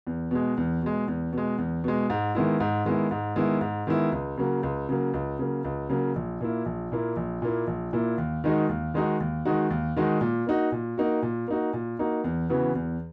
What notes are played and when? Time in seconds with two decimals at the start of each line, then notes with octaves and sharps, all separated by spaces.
0.07 E2
0.31 B2 G#3
0.57 E2
0.82 B2 G#3
1.08 E2
1.33 B2 G#3
1.58 E2
1.84 B2 G#3
2.10 G#2
2.35 D#3 G#3 B3 E4
2.60 G#2
2.85 D#3 G#3 B3 E4
3.11 G#2
3.36 D#3 G#3 B3 E4
3.61 G#2
3.87 D#3 G#3 B3 E4
4.12 C#2
4.37 C#3 F#3 A#3
4.63 C#2
4.89 C#3 F#3 A#3
5.14 C#2
5.39 C#3 F#3 A#3
5.64 C#2
5.89 C#3 F#3 A#3
6.16 A#1
6.41 A#2 A#3 E4
6.66 A#1
6.92 A#2 A#3 E4
7.16 A#1
7.42 A#2 A#3 E4
7.67 A#1
7.93 A#2 A#3 E4
8.18 D#2
8.44 D#3 G#3 D#4 F#4
8.69 D#2
8.94 D#3 G#3 D#4 F#4
9.20 D#2
9.45 D#3 G#3 D#4 F#4
9.70 D#2
9.96 D#3 G#3 D#4 F#4
10.21 A#2
10.47 A#3 D#4 F#4
10.72 A#2
10.98 A#3 D#4 F#4
11.22 A#2
11.48 A#3 D#4 F#4
11.73 A#2
11.99 A#3 D#4 F#4
12.24 E2
12.50 C#3 E3 B3 F#4
12.75 E2